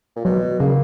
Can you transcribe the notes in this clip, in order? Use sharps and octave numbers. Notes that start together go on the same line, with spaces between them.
A#2
B2 F#3
C#3 A#3